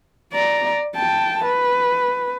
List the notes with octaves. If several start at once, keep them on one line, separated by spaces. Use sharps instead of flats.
D5 A#5
G5 A5
B4